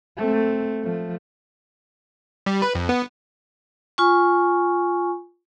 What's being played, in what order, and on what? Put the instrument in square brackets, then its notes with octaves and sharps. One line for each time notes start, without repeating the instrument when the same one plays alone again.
[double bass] A3 C4
F3 A3
[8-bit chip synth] G3
B4
F2
B3
[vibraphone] F4 G#5 C#6